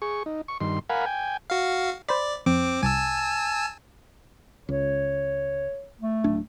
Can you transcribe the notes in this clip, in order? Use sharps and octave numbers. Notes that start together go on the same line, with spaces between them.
G#4 C#6
D#4
C#6
G2 D#3 C6
A#4 F5 F#5 G#5 B5
G5 G#5
F#4 F5
C5 D5 B5 B6
F2 C4 D6
C2 G#5 A5 E6
C#2 C#5
A3
D1 D4